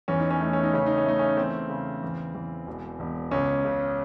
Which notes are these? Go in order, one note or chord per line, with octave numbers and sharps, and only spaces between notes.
E2 C#4
D#4
C#4
A3 D#4
C#4
D#4
C#3 C#4
D#4
C#4
A3 D#4
C#4
E2 C4
C#3
E2
E2
E1
E1
C#2 C#4
C#3